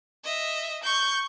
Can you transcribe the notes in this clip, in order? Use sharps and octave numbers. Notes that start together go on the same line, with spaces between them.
D#5 E5
C#6 G6